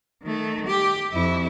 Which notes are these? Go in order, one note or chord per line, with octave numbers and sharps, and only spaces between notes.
D#3 A3
G4
F2 E4